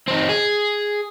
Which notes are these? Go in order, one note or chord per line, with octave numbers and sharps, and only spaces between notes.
C4 D#4
G#4